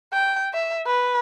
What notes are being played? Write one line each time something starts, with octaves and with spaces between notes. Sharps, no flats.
G5
E5
B4